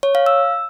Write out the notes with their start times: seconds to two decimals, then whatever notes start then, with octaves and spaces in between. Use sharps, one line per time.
0.03 C#5
0.15 F5
0.26 E6